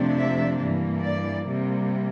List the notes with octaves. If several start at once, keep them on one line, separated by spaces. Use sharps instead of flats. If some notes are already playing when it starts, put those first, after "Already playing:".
Already playing: F2 C3 F3 A3 D4
E5
G2 E3 A#3
D5
C3 G3 A#3